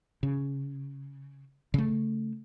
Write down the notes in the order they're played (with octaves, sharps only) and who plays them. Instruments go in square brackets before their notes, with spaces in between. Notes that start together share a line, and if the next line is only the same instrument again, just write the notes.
[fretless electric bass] C#3
C#3 A3